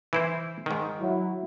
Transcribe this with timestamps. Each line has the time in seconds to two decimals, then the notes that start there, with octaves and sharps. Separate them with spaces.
0.13 E3 E4 C5
0.66 G#2 D#3
1.00 F#3 E4